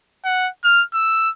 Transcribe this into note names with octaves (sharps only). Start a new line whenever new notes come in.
F#5
F6
E6